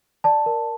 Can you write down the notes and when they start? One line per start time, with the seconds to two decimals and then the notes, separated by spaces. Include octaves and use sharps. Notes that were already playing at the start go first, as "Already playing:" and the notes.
0.24 D5 A5
0.46 A#4